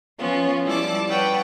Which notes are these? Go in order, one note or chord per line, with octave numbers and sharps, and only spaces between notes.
F3 B3 C#4 F4
G3 E4 A5 D6
B4 C#5 F#5 G5 A5